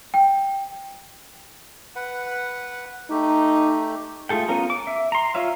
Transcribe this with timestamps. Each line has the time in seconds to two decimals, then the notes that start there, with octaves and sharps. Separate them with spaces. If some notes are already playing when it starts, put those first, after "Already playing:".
0.14 G5
1.96 B4 F#5
3.10 A3 D#4 G4
4.29 A3 F4 G#4 A4 G5
4.49 B3 C#4 F4 A#4
4.70 D6
4.87 E5
5.12 A#5 C6
5.34 F4 C#5 E5 F5